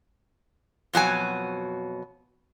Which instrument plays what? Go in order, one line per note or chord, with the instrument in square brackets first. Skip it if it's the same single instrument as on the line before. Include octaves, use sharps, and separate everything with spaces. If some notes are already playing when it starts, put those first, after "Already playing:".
[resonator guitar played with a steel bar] F2 B2 F#3 G#5